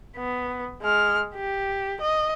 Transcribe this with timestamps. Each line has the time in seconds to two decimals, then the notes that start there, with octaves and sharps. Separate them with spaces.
0.16 B3
0.82 G#3 F6
1.35 G4
2.00 D#5